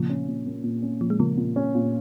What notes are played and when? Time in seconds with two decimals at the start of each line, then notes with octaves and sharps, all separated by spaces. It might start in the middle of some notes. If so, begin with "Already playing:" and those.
Already playing: A#2 C#3 F3
0.09 C#4
0.27 A#2
0.46 A#3
0.64 A#2
0.82 C#4
1.01 A#2 F3
1.10 G#3
1.19 C#3 F3 A#3
1.37 A#2
1.56 C#4
1.75 A#2